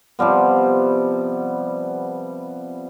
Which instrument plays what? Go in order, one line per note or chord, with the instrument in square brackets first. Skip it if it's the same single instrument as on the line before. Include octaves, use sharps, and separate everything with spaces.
[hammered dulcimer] C3 F3 G3 B3